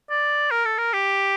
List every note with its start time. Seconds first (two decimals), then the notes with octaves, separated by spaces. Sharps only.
0.10 D5
0.51 A#4
0.65 A4
0.78 A#4
0.93 G4